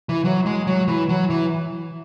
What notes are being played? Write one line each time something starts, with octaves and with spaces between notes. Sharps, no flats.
E3
F#3
G#3
F#3
E3
F#3
E3